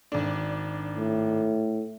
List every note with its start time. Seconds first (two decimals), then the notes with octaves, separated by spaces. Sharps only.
0.12 G#1 D4
0.97 A2